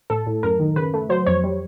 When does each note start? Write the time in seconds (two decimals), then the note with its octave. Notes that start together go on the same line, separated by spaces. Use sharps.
0.10 A2 A4
0.27 A2
0.43 F#2 A#4
0.59 D#3
0.76 C#3 B4
0.94 A3
1.09 F#3 C5
1.26 F2 C#5
1.44 G3